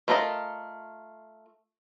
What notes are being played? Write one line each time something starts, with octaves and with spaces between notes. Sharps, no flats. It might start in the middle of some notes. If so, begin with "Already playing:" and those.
A3 F4 A#4 B4 D#5